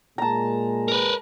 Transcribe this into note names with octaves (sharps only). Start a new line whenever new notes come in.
A#2 G#3 A5 A#5
A#4 B4